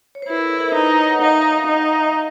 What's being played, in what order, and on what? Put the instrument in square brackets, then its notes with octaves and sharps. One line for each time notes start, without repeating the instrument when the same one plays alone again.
[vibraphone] C#5
C5
[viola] E4 [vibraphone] B4
[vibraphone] A#4
A4
A#4
C5
[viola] D#4 [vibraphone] B4
[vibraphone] C5
C#5
F#5
[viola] D#4 [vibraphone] F5
[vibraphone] E5
D#5
[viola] D#4